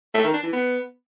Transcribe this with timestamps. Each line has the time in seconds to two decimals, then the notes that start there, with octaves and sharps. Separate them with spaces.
0.14 A3
0.24 D#3
0.34 D4
0.43 E3
0.53 B3